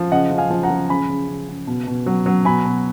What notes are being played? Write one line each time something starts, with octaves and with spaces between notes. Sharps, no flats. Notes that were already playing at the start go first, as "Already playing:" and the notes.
Already playing: F3
C#3 D#5 F#5
F3
F5 G#5
F3
F#5 A#5
F3
C#3 G#5 B5
C#3
C#3
C#3
B2
B2
F#3
F#3
B2 G#5 B5
B2